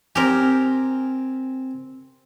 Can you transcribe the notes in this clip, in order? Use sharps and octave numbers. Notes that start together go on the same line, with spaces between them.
C4 G4 A#4 G#5